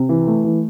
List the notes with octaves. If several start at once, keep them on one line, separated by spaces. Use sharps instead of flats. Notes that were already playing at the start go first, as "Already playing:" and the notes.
Already playing: C3
E3
A3
E3